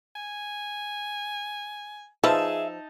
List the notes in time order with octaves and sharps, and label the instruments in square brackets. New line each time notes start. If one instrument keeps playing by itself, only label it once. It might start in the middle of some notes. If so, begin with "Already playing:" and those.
[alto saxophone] G#5
[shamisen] F3 B4 [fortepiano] D#4 A5 [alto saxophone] G#4 [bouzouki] E5